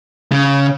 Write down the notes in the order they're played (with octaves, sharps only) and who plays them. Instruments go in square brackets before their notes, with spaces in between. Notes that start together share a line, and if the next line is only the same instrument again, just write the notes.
[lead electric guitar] C#3